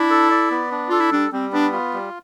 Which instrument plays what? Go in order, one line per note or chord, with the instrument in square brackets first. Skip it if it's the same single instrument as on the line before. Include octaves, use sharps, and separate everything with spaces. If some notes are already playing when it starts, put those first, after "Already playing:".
Already playing: [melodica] D4 [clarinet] E4
[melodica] A4
D5
B3
D4
[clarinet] F4 [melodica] A4
[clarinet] E4
[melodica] G3 [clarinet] D4
[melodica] G3 [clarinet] C4
[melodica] B3 [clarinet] D4
[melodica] F4
G3